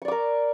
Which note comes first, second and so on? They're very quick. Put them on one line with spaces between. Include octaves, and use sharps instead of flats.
C#6 D5 D6 A#4